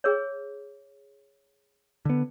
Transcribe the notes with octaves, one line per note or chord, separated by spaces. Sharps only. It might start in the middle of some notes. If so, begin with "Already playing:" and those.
G#4 A#4 C#5
D3 B3